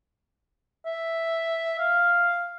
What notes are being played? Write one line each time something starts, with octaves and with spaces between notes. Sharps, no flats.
E5
F5